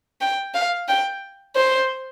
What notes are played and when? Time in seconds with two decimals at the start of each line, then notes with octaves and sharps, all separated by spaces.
0.21 G5
0.55 F5
0.88 G5
1.56 C5